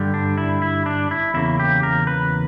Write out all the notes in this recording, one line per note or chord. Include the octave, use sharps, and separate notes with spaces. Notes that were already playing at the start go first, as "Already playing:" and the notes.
Already playing: G2 D3 G3
D4
E4
E4
D4
E4
E2 C#3 A#3 E4
G4
A#4
B4